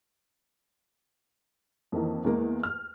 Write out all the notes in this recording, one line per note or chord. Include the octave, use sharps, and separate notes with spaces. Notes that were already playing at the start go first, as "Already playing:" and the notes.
F2 D#3 E3 A#3
E2 G#3 A#3
F6